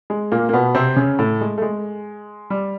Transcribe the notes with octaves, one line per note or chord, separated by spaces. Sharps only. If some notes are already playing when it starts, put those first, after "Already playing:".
G#3
A#2 A#3
A#3
B2 B3
C3 C4
C#3 C#4
A2 A3
G#3
A3
G#3
G3